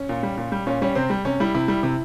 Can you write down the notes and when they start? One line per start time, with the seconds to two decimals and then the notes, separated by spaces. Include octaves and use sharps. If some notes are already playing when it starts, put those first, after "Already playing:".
Already playing: C#4
0.09 A#2
0.23 G3
0.38 A#2
0.52 G3
0.67 A#2 C#4
0.82 G3 C#4
0.95 C3 C4
1.10 G3
1.25 C3 C#4
1.40 G3 E4
1.54 C3 E4
1.68 G3
1.83 C3